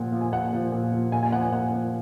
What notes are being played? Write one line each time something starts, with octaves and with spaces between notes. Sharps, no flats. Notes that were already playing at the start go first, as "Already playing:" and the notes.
Already playing: A#2 F3 F#5
F3
G#5
A#2 F#5
F3
A#2
F3
A#2 G#5
G#5
F3 F#5
G#5
A#2 F#5
F3